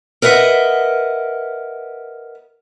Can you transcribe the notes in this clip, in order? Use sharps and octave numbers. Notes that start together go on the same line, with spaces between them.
A#4 B4 D#5 E5 F#5